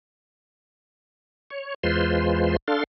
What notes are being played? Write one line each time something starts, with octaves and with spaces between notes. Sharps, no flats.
C#5
E2 G#3 F4 B4 C5 C6
D4 A4 F5 C6